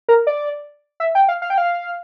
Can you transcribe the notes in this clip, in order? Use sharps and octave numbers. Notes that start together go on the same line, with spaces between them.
A#4
D5
E5
G5
F5
F5
G5
F5